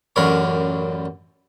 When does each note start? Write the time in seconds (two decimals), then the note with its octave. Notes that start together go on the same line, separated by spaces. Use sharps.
0.16 A1 F#2 D4 A#4 C#5 B5